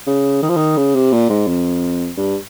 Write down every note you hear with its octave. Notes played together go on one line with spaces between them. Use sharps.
C#3
D#3
F3
D#3
C#3
C3
A#2
G#2
F2
G2